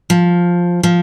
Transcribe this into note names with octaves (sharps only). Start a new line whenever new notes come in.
F3
F3